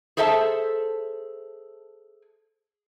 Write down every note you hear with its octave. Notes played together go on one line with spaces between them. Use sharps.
G#4 A4 C5 E5 F#5 A5